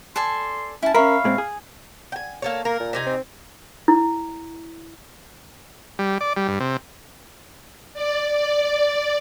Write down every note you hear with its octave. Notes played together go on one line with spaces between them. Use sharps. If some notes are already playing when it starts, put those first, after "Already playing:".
A4 D5 G#5 C6
C#4 E4 A5
C#4 A#4 C#5 E5 F5 B5
A#2 G#3 C4
G#4
G5 G#5
A#3 A4 C#5
A#3 A#4
A#2
C3 D#4 G#5
C4
E4
G3
D5
G3
G2
C3
D5
D5